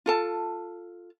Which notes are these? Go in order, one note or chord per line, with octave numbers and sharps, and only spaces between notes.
F4 A4 A5